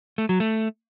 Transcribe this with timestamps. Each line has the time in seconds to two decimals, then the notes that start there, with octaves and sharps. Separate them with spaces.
0.18 A3
0.29 F#3
0.40 A3